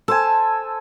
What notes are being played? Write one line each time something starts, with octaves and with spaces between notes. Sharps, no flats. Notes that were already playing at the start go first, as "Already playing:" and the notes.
A4 C5 G#5 A5